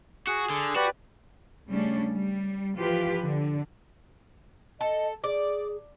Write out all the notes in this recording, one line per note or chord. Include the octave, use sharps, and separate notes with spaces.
F#4 G#4
D3
F#4 G4 B4 D5
C#3 G3 A3 C#4 D4
G3
E3 F3 F4 G4 B4
D3
A4 D#5
G#4 D5